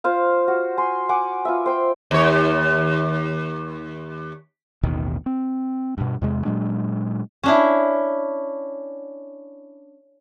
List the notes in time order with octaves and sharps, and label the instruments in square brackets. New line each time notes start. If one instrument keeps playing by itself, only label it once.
[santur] F4 C5 F5
F#4
G#5 C6
F#5 G#5 D6
F4 B4 E5
C5 G5 C6
[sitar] D#2 C#5
[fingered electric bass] A1 D#2 B2 D#3
C4
G2 B2
E2 C3 G#3
A#2 F#3 G#3 D4
[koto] C#4 D4 E4